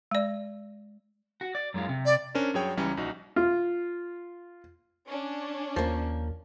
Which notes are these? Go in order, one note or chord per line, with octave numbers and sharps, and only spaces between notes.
G#3 D5
F#4
D5
F#2 G#3 F4
C3
D5
C#4 D4 A#4 C5
G2 F#3 G#4 C#5 G5
C#2 E3 G3 C#4 C#5 A#5
A#1 D#4 F#4
F4
C#4 D4
D#2 F3 A#3